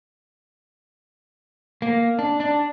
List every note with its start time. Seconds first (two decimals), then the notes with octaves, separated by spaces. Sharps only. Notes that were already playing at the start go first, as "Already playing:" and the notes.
1.82 A#3
2.19 D4
2.40 D4